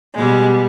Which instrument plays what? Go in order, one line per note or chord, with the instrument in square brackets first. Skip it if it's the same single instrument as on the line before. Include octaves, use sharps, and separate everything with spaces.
[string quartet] B2 G3 G#3